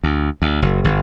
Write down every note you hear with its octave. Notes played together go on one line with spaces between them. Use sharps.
D2
D2
F#1
G1